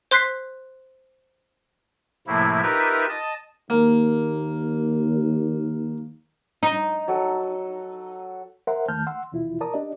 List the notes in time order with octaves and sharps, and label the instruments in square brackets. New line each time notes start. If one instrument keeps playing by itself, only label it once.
[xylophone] C5 C6 F#6 B6 C7
[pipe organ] A2 C3 F3 A3 A#3 E4
D#4 F4 G4 A#4 B4 E5
D#5 A5
[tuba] D#2 [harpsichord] A#3
[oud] D#4
[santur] F#3 A4
[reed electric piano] A#4 C5 E5 F#5 C6
E2 D#3 A3 A5 F6 G6
F#5 C6 E6
D#2 B2 E3 E4 F4
A#4 D5 A5 A#5 D6 D#6
D4 G4 D5 D#5